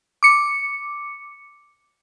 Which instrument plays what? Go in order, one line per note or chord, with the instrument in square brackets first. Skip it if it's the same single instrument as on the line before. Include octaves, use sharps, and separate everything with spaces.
[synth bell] D6 C#7